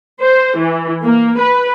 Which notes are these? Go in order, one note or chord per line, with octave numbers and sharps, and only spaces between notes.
C5
E3
A#3
B4